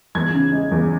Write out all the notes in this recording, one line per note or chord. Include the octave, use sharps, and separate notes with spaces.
E2 G#6
C#3
G#3
E2